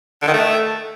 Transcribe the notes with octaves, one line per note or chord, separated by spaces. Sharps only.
D3
D#3
A3